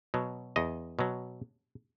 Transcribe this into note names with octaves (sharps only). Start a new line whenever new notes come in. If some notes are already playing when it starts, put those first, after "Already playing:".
B2 F#3
E2 D#5
B2 F#3